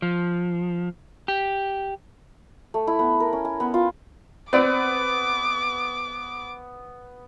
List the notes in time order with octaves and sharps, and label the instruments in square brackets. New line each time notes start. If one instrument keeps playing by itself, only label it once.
[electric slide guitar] F3
G4
[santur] A3
E4
B3
A#4
C#4
G#5
B3
F4
[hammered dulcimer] B3 [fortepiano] C4 D5 [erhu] D6